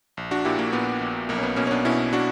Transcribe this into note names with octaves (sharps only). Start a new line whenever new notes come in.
A#1
D4 F#4
A#2 E4 G4
A#3
A#2 B3
A#1
B1 A#3
C#4
B3
B2 A#3 C#4
C#4
B3 D4
B2 C#4 E4
D4 F#4